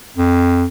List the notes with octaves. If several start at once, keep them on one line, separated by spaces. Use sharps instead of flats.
F2